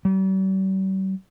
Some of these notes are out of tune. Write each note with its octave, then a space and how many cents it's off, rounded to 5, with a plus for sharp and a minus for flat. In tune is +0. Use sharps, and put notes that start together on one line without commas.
G3 -45